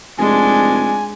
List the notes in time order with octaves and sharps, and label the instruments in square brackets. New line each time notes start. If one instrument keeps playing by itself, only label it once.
[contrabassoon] F1 [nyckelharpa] G#3 D4 [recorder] G#5